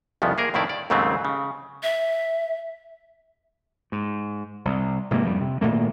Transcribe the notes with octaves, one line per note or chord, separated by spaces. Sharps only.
C2 F2 C#3 F3 B3
A#3 G#4 A#4
F2 A2 D#3 E4 D5
D5
D#2 G#2 C#3 F#3 A3 C4
C#3
E5
G#2
C2
F1 G#2 C3 A#3
F2 G3
C3
G#1 A#2 A3 A#3